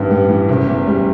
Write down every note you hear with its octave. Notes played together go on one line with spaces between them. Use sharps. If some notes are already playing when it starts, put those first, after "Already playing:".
Already playing: A1 G2 D#3 B3
G3 B3
E3
F#1
E2
G3